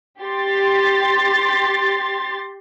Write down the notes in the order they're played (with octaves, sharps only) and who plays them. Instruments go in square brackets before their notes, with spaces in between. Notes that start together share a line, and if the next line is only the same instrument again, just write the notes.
[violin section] G4 C6 A6